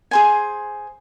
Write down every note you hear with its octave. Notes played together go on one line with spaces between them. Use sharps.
G#4 C5 G#5